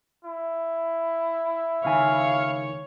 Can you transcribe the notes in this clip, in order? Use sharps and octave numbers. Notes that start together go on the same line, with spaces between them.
E4
C#2 D#3 C#5 F5 G#5